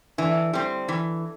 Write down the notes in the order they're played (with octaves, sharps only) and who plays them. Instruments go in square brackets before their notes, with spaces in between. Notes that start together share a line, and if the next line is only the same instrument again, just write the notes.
[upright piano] D3 [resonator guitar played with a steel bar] E3
[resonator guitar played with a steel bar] G3 C4
E3